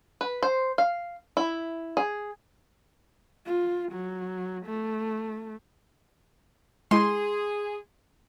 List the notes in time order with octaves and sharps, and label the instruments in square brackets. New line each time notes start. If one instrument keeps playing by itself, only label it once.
[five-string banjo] B4
C5
F5
E4
G#4
[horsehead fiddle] F4
F#3
A3
[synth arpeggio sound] G#3 E4 [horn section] G#4 [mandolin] C6